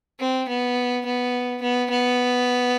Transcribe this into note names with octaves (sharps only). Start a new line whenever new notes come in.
C4
B3
B3
B3
B3